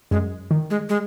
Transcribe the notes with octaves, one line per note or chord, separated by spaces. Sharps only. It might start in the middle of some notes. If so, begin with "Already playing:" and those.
F#2 G#3
D#3
G#3
G#3